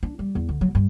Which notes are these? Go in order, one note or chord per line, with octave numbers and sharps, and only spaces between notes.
D4
G3
E2
D2
F#3
G2